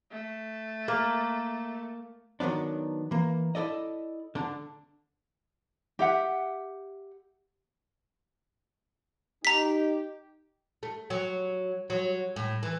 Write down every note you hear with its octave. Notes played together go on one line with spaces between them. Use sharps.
A3
A#3
D#3 F#3 B3 D4
E3 A#3
E4 A4 D5 D#5
D3 D4
G4 E5 F#5
D#4 G4 A#5 B6
A3
F#3
F#3
A2
E3